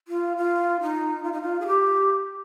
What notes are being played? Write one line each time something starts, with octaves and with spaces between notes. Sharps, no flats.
F4
F4
D#4
F4
D#4
F4
G#4
G4